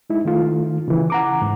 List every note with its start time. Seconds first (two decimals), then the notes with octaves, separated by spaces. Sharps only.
0.10 G#3 D#4 E4
0.25 D#3 A3 F4
0.88 C#3 E3
1.10 F#5 A#5 D6
1.42 G#2